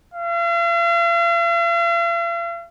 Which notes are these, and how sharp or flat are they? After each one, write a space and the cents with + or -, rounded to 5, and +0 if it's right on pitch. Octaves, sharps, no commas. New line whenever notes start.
F5 -45